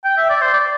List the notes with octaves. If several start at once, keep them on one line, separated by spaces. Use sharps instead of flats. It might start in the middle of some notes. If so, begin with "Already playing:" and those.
G5
E5
D5
C5
D5